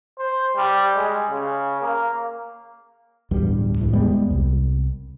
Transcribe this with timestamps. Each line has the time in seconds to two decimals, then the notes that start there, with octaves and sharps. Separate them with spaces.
0.19 C5
0.56 G3
0.96 G#3
1.29 C#3
1.81 A#3
3.31 D1 E2 G2 G3
3.79 C#2 A2 E3
3.93 E2 G3 G#3 B3
4.30 C2